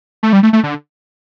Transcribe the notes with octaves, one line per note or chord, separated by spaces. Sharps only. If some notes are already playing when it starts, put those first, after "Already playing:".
A3
G3
A3
A3
D3